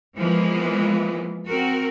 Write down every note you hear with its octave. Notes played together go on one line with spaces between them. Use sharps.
E3 F3 G#3 A#3 B3
C4 F#4 A#4